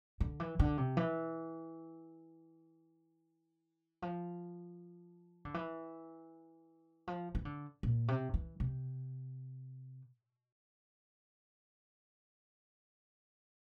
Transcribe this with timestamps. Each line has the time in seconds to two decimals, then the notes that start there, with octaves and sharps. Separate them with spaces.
0.20 D3
0.40 E3
0.59 D3
0.78 C3
0.97 E3
4.02 F3
5.45 D3
5.54 E3
7.08 F3
7.35 E3
7.45 D3
7.83 A#2
8.08 C3
8.34 E3
8.60 C3